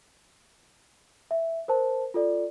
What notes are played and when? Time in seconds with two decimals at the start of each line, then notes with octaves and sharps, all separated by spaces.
1.31 E5
1.68 A#4 C5 A5
2.14 F4 A4 D5